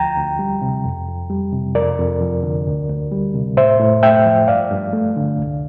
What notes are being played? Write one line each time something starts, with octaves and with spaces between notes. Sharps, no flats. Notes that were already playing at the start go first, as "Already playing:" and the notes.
Already playing: D2 F3 G5 A#5
D2
G3
C3
F2
F2
G3
C3
F2 A#4 D5
F2
F3
D3
D2
D2
G3
C3
A2 C5 E5
A2
A3 E5 G5
F3
G2 D5 F5
G2
A3
D3
C2